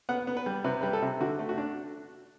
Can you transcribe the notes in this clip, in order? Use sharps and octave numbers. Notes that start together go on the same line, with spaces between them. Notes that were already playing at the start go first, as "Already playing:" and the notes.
B3 F#5
B3
B4
G3
C3 B4
G3 B4
A4
C3
D3 F#4
A3
F#4
D4